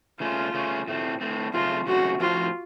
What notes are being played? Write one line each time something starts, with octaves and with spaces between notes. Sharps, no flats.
C#3 A3 C#4 F4
C#3 A3 C#4
A2 A3 C4
A2 A3 C4
F#2 C#3 A3 C4 F4
F#2 C#3 A3 C4 F#4
A2 F3 C4 F4 F#4 C5